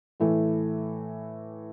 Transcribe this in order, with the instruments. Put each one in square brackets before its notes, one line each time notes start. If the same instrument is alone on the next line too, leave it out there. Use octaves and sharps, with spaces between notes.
[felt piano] A2 E3 A3